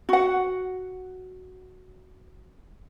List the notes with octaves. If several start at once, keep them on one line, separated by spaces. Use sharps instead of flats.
F#4 F#5